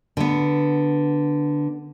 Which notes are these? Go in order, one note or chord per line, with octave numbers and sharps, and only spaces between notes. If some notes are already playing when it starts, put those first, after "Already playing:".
D3 B3